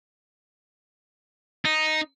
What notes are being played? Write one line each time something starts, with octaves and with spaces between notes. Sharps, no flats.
D#4